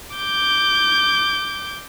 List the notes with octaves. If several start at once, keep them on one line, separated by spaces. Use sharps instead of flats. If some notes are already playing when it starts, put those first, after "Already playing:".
D6 G6